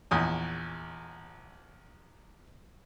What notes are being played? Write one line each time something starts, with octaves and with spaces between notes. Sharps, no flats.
A#1 E2 D#6